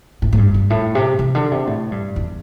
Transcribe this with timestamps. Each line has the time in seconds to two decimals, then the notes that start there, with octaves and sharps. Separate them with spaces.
0.22 A2
0.33 A2
0.38 G2
0.54 G2
0.70 A2
0.95 C3
1.19 C3
1.35 D3
1.52 C3
1.67 A2
1.92 G2
2.16 E2